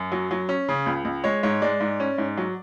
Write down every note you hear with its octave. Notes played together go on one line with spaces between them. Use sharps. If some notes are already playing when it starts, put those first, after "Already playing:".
Already playing: F#2
F#3
F#3
C#4
C#3
C#2
C#2
G#3 C#5
G#2 C#5
G#3 D5
G#2
C#4
G#2
F#3